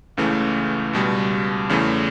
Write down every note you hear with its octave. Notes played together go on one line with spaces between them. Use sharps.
C#2 C#3 E3 A3
C#2 B2 G3
E2 C#3 E3 A3